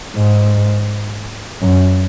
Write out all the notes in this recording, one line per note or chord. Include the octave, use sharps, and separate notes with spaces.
G#2
F#2